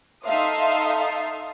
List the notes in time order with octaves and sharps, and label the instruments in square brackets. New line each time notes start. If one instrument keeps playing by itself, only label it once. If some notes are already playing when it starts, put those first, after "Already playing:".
[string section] D#4 A4 E5 F5 C6 D#6